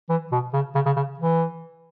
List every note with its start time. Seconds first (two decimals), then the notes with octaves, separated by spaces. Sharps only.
0.09 E3
0.32 B2
0.53 C#3
0.75 C#3
0.86 C#3
0.97 C#3
1.19 E3